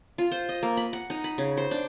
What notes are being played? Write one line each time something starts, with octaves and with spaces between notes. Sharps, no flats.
F4
C5
D#5
A#3
B5
F#5
D#4
B5
C#3
C5
D4